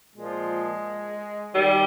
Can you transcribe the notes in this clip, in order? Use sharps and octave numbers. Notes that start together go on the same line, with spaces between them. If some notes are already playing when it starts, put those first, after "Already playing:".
A#2 F3 G#3
D#3 G3